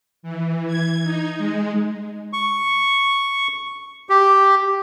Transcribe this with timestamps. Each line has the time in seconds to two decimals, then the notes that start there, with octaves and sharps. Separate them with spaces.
0.23 E3
0.67 G#6
1.04 D#4
1.38 G#3
2.33 C#6
4.09 G4